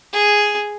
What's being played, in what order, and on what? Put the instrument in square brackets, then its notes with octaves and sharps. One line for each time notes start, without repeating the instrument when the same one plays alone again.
[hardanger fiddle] G#4